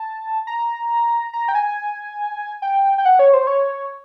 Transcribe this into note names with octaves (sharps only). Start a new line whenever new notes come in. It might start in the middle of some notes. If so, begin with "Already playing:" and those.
Already playing: A5
A#5
A#5
G5
G#5
G5
G5
F#5
C#5
C5
C#5